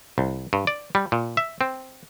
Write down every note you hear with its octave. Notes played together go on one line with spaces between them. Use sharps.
C2
G2
D5
G3
A#2
E5
C4